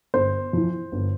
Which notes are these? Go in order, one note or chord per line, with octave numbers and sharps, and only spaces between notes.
G1 C5
F2 E3
G1